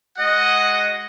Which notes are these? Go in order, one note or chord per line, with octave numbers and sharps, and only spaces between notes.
G#3 F#4 D#5 F#5